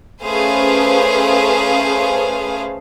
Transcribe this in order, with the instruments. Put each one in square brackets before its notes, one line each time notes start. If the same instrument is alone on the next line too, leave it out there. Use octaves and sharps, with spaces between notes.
[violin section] A3 C#4 G#4 B4 C5 F5